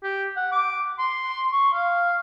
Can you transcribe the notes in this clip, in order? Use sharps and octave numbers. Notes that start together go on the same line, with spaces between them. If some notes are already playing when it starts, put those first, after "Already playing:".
G4
F#5
D6
C6
C#6
F5